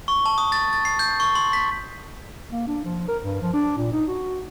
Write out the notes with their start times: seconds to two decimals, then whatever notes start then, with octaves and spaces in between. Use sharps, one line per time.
0.08 C#6
0.26 A5
0.38 D#6
0.52 A6
0.73 A6
0.85 C7
0.99 G6
1.20 C#6
1.35 C6
1.53 B6
2.52 A#3
2.67 D4
2.85 F3
3.08 A#4
3.23 G2
3.42 F3
3.53 D4
3.78 A#2
3.92 D#4
4.08 F#4